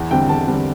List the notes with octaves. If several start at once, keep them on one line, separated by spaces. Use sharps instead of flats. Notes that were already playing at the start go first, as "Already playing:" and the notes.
Already playing: E2
D3 G3 C4 G5
E2 A5
D3 G3 C4